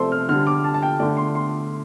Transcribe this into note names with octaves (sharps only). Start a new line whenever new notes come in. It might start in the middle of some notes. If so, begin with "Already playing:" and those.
Already playing: C3 F3 A3 A4 C5 D5 C6
F6
D3 G3 F6
D6
A5
A5
G5
D3 A3 D5
C6
C6